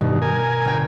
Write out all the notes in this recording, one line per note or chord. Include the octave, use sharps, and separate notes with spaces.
G2 B2 D#3
A#4 G#5 G6
G1 G5